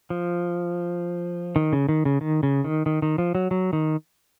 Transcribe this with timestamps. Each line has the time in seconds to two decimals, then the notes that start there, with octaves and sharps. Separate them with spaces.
0.10 F3
1.56 D#3
1.73 C#3
1.89 D#3
2.05 C#3
2.21 D#3
2.43 C#3
2.64 D#3
2.86 D#3
3.02 D#3
3.18 F3
3.35 F#3
3.51 F#3
3.73 D#3